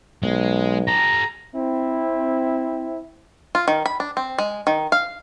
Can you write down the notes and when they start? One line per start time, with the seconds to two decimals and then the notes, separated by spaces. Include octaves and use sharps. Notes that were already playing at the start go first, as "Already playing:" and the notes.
0.23 B1 G#3
0.87 G4 A4 A#5
1.54 C4 E4
3.55 F4
3.68 D#3
3.86 B5
4.00 D4
4.17 C4
4.38 G#3
4.67 D#3
4.92 F5